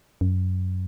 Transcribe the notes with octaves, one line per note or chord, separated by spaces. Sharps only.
F#2